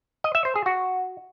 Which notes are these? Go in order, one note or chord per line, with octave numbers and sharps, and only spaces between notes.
D#5
E5
C5
G#4
F#4